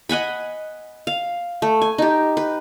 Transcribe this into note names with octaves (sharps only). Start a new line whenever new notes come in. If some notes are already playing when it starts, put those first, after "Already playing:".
D#5 F#5 G#5 B5
F5
A3
G#5
D#4 G4
B4